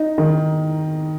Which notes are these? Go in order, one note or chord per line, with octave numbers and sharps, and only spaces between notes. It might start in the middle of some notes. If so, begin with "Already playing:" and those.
Already playing: D#4
D#3